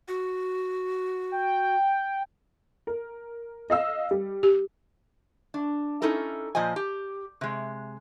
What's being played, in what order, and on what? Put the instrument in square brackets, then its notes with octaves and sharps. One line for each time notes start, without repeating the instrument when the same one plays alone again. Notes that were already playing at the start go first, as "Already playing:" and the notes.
[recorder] F#4
[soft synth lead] G5
[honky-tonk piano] A#4
D#5 F5 E6
G3
[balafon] G4
[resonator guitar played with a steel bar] D4
C#4 D#4 E4 A4 A#4
A#2 F3 C5 D#5 G#5
G4
C3 G#3